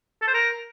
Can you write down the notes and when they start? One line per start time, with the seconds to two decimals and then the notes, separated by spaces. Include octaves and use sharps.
0.22 A4
0.28 C5
0.34 A#4